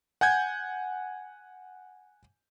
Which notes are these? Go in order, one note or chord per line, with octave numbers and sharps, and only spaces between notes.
F#5 G#5 G6 G#6